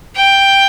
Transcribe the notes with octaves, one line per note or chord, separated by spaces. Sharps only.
G5